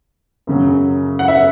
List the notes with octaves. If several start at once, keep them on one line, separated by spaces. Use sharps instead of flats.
F#2 C#3 F#3
F#5
E5